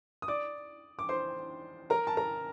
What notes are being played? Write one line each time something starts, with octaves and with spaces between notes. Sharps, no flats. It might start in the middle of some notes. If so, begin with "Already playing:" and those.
D#6
D5 D6
D6
C5 C6
A#4 A#5
A5
A#4 A#5